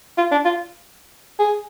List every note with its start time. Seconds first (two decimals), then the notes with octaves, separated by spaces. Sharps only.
0.17 F4
0.31 D4
0.45 F4
1.39 G#4